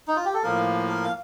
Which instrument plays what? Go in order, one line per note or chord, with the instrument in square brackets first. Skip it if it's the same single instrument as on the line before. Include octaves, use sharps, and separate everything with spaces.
[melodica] D#4
F4
G4
A4
[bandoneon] A2 F3 A#3 [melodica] A#4
[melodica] A#4
F5